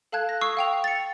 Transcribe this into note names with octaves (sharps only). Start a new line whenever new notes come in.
A4 F5 A5 F#6 G#6
A#6
C#6 D#6 E6 C7
F5 G5 F7
A6 C#7